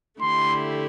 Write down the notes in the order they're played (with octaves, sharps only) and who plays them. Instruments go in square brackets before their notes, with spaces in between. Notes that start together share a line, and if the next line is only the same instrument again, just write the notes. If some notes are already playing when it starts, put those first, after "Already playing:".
[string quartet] D3 A3 E4 G4 [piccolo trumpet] C6